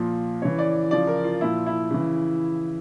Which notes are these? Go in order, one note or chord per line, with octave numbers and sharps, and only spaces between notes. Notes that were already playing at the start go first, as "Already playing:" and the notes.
Already playing: A#2 F3
C#3 E3 C#5
D5
C#3 F3 D5
A#4
F4
A#2 F3 E4
E4
C#3 E3